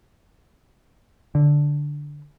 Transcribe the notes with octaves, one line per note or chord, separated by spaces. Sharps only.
D3